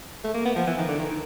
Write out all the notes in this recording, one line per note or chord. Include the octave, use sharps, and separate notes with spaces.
A3
A#3
B3
F3
E3
D#3
D3
D#3
D#3